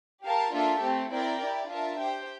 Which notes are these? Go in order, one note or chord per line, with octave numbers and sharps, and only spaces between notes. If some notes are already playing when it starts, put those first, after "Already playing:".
G4 A#4 F5 A5
A#3 D4 F4 A4 E5
A3 C4 G4
C4 E4 A#4 D5 G5
E4 G4 D5
D4 F4 A#4 E5 A5
G4 C5 G5